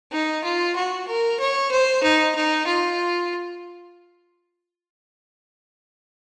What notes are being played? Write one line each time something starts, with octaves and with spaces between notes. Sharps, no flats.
D#4
F4
F#4
A#4
C#5
C5
D#4
D#4
F4